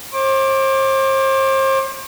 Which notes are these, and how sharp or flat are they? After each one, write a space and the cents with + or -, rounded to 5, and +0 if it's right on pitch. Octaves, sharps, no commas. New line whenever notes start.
C5 +40 D6 +0